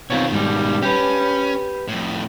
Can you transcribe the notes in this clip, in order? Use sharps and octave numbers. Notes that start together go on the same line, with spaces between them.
B2 D#3 C4 F4 C#5
G#2 G3
C#4 G4 B4
F2 A2